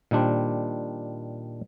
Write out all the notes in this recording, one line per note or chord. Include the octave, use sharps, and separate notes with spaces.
A#2 D#3 G3 D4 C5